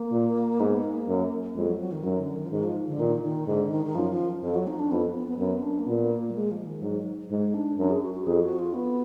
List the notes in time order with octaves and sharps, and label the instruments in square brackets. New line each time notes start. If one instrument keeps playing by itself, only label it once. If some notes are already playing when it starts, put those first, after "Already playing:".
Already playing: [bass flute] A#3
[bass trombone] A#2
[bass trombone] G#2 [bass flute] B3
[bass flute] A#3
[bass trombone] F#2
[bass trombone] F2 [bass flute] G#3
[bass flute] F#3
F#3
D#3
[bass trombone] F#2 [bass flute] F#3
[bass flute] D3
D#3
F3
[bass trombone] G#2 [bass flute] D#3
[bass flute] F3
D3
[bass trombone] A#2 [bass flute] D#3
[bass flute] D#3
[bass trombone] G#2 [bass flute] D3
[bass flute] D#3
D#3
[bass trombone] F#2 [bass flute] F3
[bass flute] F3
[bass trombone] F2 [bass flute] F3
[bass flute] F#3
D#4
D4
[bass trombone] F2 [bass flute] B3
[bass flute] B3
B3
[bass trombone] F#2 [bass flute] B3
[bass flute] D4
A#3
[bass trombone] A#2 [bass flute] B3
[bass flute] A#3
F#3
G#3
F3
D#3
[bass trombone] G#2 [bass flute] F#3
[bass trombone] G#2 [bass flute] G#3
[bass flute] D4
[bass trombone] F#2 [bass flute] D4
[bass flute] G#4
F#4
F#4
[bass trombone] F2 [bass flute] G#4
[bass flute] F#4
F4
B3